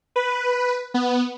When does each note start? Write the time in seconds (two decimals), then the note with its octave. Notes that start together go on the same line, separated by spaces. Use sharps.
0.16 B4
0.94 B3